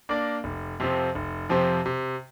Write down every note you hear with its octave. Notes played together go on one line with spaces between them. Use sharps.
A#3 D4 A#4 D5
F1
F2 C3 F3 C4
F1
F2 C3 F3 C4
C3